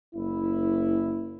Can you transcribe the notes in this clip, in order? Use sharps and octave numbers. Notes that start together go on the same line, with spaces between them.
F#1 E4